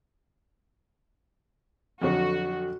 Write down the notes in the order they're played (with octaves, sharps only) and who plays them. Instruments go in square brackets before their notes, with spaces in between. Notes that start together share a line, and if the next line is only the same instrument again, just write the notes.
[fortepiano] F2 D3 F#3 [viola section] F#4